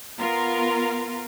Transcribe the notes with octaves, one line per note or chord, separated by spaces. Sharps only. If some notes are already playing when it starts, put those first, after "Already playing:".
B3 F4 A#4